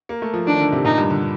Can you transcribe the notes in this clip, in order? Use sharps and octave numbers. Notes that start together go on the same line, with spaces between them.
A#3
A3
F3
D#3 D4
D3
C3
A#2 D#4
G2
D3